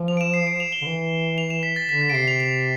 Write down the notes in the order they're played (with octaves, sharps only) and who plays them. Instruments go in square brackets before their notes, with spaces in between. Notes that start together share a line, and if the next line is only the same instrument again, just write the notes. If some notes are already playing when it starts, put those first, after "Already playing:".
Already playing: [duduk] F3
[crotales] F7
D7
E7
C7
D7
F7
G7
[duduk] D3
E3
[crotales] F7
E7
B6
A6
[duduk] D3 [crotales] B6
[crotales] A6
D7
[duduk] C3 [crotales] C7
[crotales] F7
F7